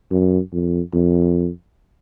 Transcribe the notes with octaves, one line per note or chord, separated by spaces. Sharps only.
F#2
F2
F2